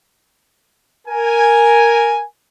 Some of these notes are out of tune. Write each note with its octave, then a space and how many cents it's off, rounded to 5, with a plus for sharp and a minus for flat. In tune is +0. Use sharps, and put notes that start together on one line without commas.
A#4 +0 G#5 +0